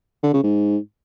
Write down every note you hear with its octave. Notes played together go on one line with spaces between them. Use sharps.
D3
C#3
G#2